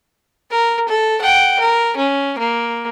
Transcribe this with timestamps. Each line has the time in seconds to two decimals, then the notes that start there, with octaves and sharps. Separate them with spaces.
0.51 A#4
0.88 A4
1.21 F#5 G5
1.59 A#4
1.96 C#4
2.38 A#3